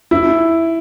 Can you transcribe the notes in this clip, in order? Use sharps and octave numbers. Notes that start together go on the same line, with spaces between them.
E4